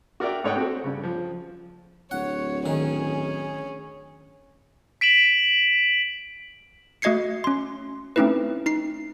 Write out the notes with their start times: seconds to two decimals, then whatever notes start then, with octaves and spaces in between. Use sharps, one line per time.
0.20 F#4 A#4 D5 E5 G5
0.44 G#2 A3 C#5 D#5 F#5 G5
0.56 C4 F#4 A4
0.84 G2 C#3
1.03 F3
2.11 D1 C#5 F#5
2.66 D#3 C#4 G#4
5.01 B6 D7 E7 F#7
7.02 A3 F#4 D#5 G#6 C7 C#7
7.44 C#4 C6
8.16 A3 C4 C#4 D#4 E4 B4
8.66 D#4 C7